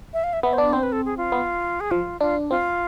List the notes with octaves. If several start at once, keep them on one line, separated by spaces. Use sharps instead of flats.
E5
F5
E5
B3 E5
C5
D4 D5
C4 C5
B4
A4
G#4
F4
B3
G#4
F3 F4
D4 F4
C4 F4